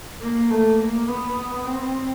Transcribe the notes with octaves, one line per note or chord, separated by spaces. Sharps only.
A#3
A3
A#3
B3
C4